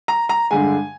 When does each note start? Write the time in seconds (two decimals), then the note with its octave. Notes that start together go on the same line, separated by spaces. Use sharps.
0.08 A#5
0.29 A#5
0.51 G2 D3 G#3 G#5